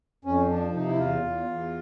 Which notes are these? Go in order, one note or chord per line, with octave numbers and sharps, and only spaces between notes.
F2 C#4
F3 D4
C3 D#4
E4
E2 F4
E2
E2